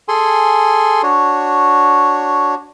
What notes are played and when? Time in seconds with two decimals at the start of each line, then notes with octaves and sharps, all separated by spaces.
0.08 G#4 A4 G#5 C6
1.03 D4 F#4 C#5